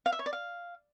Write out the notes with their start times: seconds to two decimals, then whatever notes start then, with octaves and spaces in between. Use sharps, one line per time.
0.06 F5
0.12 E5
0.19 C#5
0.26 D5
0.33 F5